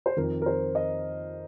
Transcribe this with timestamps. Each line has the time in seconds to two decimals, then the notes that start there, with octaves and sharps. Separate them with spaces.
0.06 C5
0.17 F2 D#3 A#4
0.42 A#4
0.46 C5
0.75 D#5